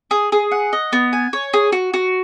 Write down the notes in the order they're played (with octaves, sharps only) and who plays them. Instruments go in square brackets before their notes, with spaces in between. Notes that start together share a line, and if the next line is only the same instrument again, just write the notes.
[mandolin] G#4
G#4
F#5
D#5
B3
G#5
C#5
G#4
F#4
F#4